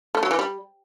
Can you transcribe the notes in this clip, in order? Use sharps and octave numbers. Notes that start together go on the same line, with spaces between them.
A3
F#3
E3
G3